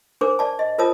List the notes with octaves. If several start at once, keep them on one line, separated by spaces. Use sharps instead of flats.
D4 A#4 C5 D6
D5 A5
D#5
F4 A#4 C5 C#5 A5 D#6